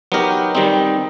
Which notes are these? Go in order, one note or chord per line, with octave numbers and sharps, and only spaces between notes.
F#3 B3 D#4 G4 A#4
D#3 G3 C4 D#4